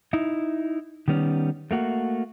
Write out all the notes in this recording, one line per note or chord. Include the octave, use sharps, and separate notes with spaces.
D#4 E4
D#3 G3 B3 C#4
A3 A#3 F#4